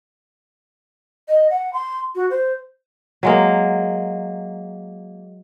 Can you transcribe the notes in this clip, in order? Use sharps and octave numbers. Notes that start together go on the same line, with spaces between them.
D#5
F#5
C6
F#4
C5
F#3 G#3 A#3